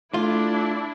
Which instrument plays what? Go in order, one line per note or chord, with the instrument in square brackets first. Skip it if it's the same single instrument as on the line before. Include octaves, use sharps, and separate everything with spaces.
[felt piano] A3 [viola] D4 E4 [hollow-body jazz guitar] F4